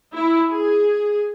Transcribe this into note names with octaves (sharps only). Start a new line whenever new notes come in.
E4
G#4